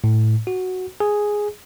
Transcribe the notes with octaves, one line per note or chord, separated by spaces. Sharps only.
A2
F#4
G#4